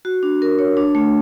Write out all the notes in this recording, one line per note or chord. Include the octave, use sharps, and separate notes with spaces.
F#4
D4
A#4
C#5
D4
A3